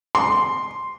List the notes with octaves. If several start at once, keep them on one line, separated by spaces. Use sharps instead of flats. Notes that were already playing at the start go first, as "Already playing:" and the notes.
C6